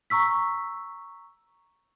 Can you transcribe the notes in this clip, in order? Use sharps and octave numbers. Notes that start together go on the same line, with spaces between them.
A#5 C#6 E6 B6